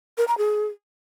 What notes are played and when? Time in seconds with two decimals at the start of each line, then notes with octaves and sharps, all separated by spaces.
0.18 A#4
0.28 A#5
0.38 G#4